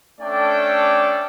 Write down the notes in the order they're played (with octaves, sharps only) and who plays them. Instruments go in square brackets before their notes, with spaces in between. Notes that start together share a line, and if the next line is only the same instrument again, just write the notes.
[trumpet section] A3 C#4 D4 A4 D5 G5